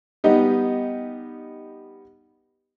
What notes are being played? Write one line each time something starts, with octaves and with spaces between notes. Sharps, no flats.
G3 B3 D#4 G4